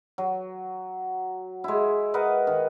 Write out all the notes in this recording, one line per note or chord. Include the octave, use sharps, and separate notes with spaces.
F#3
G#3 E4
A#4 B4 D#5 F#5
D#3